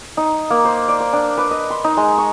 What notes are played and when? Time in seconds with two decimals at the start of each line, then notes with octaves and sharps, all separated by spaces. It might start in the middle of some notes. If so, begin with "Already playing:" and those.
0.17 D#4
0.50 A#3
0.65 C5
0.88 D5
1.00 C5
1.13 D4
1.37 B4
1.51 D#5
1.70 C6
1.84 D#4
1.97 G#3
2.18 C#6